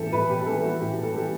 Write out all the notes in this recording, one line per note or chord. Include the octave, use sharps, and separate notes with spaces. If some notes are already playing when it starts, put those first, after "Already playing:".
Already playing: A2 E3 G3 G4 A4
A2 B4
G4
B4
E3 G3 A4
F#4
A2 G4
A4
E3 G3 G4